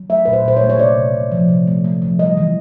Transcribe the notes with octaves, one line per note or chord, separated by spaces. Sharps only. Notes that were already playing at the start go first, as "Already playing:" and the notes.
Already playing: F#3
A3 E5
A#2 B4
C5
A#2 C5
C#5
A3
C#5
C3 D5
C3
C3
F3
C3
A3
A3
F3
G3 D#5
E3